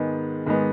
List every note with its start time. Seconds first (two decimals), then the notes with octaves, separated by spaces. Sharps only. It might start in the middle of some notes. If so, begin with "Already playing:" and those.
Already playing: G#2 D#3 G#3 B3
0.46 G#2 D#3 G#3 B3